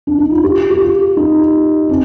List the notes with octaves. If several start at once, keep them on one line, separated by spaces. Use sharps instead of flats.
D4
D#4
F4
G4
G4
F4
D#4
C4